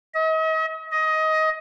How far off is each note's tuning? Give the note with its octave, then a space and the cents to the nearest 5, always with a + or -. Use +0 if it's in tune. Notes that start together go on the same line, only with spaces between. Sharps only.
D#5 +40
D#5 +15